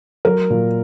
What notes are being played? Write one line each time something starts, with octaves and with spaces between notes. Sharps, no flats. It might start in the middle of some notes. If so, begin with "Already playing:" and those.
F#3 A#4
A#2